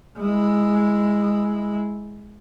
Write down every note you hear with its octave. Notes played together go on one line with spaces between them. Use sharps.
G#3 E4